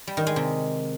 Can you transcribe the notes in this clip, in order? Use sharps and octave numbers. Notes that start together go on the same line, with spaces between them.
G3
D#3
G#3
C3